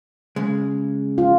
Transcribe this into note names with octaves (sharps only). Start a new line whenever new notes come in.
C#3 G#3
F4